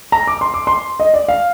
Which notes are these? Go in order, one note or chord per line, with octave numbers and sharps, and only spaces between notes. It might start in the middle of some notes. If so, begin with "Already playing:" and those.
A#5
D6
C6
D6
C6
D#5
D5
F5